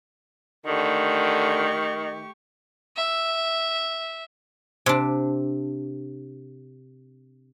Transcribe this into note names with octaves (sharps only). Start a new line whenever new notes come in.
D3 D#3 A3 G4 C#6
E5
C3 D4